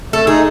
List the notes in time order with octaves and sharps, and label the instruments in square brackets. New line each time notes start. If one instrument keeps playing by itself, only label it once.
[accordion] A3 [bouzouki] A4
[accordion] D#4 [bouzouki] G#4